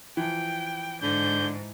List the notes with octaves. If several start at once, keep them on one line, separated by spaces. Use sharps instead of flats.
E3 F3 G5
G#2 D3 G6